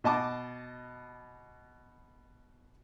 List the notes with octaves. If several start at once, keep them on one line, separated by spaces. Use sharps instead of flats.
B2 D#5 A5 D6